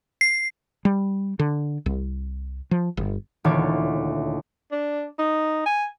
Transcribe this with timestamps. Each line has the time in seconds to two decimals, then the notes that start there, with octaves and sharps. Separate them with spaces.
0.21 C7
0.85 G3
1.39 D3
1.86 C2
2.71 F3
2.97 G1
3.44 D#1 D2 E3 C#5 D6 A6
4.72 D4
5.19 D#4
5.66 G#5